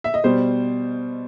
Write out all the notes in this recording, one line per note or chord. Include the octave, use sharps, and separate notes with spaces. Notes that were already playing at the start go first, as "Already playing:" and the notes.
E5
D#5
B2 G3 C5